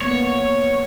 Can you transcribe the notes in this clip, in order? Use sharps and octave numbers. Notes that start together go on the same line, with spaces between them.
A#3 B3 C#5